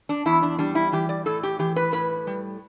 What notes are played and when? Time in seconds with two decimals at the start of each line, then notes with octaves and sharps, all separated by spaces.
0.09 D4
0.26 E2 E4
0.42 D4
0.58 G3 D4
0.75 E4
0.92 E3 G4
1.09 D5
1.26 A2 A4
1.43 G4
1.59 E3 G4
1.76 B4
1.93 A2 B4
2.27 G3